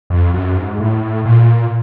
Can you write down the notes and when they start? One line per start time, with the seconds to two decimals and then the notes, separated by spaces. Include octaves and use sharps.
0.10 F2
0.34 F#2
0.57 G#2
0.80 A2
1.26 A#2